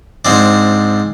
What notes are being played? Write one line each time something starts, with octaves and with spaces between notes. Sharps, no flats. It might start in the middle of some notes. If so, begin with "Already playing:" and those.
G#2 C4 D4